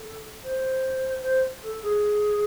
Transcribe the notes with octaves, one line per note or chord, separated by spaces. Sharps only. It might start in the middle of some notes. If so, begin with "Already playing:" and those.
Already playing: A4
C5
C5
A4
G#4